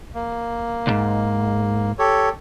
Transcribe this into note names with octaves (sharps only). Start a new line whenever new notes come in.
A#3
C2 G#2
G4 A4 C#5